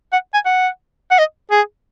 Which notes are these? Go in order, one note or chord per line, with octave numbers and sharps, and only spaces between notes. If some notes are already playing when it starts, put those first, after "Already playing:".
F#5
G#5
F#5
F#5
D#5
G#4